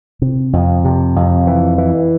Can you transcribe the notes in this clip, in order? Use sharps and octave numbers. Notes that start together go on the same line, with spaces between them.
C3
F2
C3
F2
E3
E3